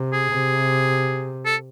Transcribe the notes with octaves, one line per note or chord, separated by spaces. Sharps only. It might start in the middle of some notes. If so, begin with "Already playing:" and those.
Already playing: C3
G#4
C3
A4